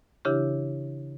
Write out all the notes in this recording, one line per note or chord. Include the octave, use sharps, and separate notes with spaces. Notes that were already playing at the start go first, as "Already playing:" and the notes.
C#3 E3 D4 E4 G4